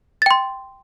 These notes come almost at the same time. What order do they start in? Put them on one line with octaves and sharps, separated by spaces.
A6 G5 C6